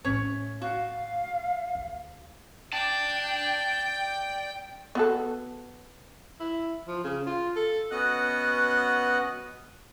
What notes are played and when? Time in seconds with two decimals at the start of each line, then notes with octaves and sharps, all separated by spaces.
0.05 A2 A3 C#4 C#5
0.62 F#4 F5
1.75 D2
2.73 D5 G5 A5
4.95 B3 F#4 A4
6.40 E4
6.87 F3
7.04 C#3
7.26 F4
7.56 A4
7.91 B3 C#4 F#4 D#5 F#5 F#6